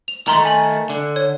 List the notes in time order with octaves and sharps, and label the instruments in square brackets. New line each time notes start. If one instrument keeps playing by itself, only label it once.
[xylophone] F7
[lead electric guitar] D#3 A3 [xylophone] A#5 C6
[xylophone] G#5 F#7
[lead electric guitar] D3
[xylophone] C#5